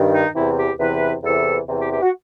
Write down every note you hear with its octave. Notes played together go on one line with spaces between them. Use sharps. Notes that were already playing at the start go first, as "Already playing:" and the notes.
Already playing: G2 D#3
D#4
E2 C3 E3 E4
G4
E2 C3 E3 B4
E2 C3 E3 A4
E2 C3 E3
G4
G4
F#4